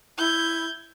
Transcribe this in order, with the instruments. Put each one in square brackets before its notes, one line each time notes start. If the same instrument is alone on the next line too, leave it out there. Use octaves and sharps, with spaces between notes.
[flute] E4 [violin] G6 G#6